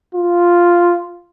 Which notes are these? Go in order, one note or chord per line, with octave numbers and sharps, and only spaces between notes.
F4